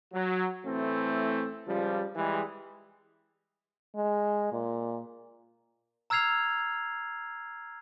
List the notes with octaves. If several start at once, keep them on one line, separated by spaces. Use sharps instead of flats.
F#3
A2 E3 A3 C4
C#2 F3 G3
E3 G3 G#3
G#3
A#2
A#5 E6 F6 G#6 C7 F7